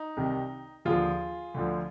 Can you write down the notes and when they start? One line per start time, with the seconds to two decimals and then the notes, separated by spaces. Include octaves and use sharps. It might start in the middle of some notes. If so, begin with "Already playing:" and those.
Already playing: D#4
0.17 C2 C3 D#3
0.85 D#2 D3 F3 F4 G#4
1.54 D2 D3 F3